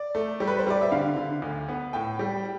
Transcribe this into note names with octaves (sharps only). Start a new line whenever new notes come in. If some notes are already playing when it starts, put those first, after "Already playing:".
Already playing: D5
A3
G3
B4
C5
G3 D5
E5
D3 F5
D3
D2
B3
A2 G5
G3